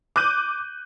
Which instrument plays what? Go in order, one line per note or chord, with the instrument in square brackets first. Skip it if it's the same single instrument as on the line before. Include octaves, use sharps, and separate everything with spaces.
[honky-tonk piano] D6 F#6 G6 D#7